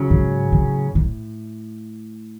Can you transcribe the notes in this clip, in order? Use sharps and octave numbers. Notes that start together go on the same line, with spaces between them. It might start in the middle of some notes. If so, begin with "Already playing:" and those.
Already playing: C#3 F#3 C#4
G#2
A2
A2